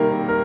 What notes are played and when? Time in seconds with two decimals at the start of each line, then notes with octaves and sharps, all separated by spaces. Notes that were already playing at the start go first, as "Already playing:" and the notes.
Already playing: C3 D#3 G3 A#3 A#4
0.29 A#4